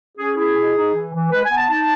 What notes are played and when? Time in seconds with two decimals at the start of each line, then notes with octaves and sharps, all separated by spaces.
0.17 C#4 G#4
0.36 E4 G#4
0.56 B2
0.75 D#4
0.94 E3
1.13 E3
1.31 G#3 B4
1.44 G#5
1.50 B3
1.57 A5
1.69 D#4 A5